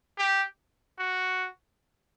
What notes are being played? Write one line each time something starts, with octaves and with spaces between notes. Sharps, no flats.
G4
F#4